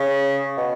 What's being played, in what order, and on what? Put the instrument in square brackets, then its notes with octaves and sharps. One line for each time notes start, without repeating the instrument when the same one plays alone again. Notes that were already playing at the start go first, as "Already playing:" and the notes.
Already playing: [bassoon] C#3
B2